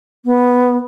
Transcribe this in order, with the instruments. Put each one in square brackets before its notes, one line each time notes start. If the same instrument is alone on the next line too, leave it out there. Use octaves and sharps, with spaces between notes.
[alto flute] B3